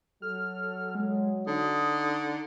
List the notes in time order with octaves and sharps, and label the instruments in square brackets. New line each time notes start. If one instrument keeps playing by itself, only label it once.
[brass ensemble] F#3 [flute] A4 [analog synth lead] F6
[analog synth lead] G#3
[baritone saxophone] D3 [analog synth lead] D#4 [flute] D#6